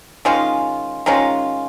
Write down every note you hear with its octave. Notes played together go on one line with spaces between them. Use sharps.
D#3 G#3 C#4 F4
D#3 G#3 C#4 F4